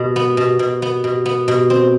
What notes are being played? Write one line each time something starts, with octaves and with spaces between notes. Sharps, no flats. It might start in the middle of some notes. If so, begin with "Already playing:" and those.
Already playing: B2
B3
B2
B2
B3
B2
B3
B2
C4